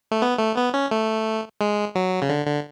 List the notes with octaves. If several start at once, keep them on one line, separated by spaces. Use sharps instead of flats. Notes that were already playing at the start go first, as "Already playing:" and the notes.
A3
B3
A3
B3
C#4
A3
G#3
F#3
C#3
D3
D3